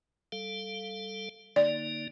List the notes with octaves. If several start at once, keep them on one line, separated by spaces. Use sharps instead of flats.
G3 A4 F5
D3 A#3 D#4 D5